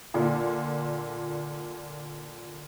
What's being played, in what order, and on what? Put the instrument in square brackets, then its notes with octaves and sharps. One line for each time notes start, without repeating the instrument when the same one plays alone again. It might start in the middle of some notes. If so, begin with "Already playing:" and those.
[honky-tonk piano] A#2 D3 F4